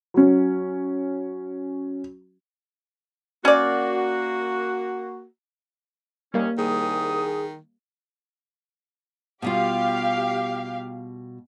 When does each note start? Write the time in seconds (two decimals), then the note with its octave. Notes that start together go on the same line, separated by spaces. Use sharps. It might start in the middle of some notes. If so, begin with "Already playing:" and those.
0.14 F#3 C#4
3.45 A#3 C#4 F#4 D5
6.34 D#2 D#3 G3 A#3 C#4
6.58 C2 D#3 G#4 D#6
9.42 B2 G3 F4 G4 F5